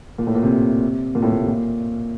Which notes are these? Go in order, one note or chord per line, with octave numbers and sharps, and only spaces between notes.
A#2
A2
A#2
C3
A#2
A2
A#2
C3
A#2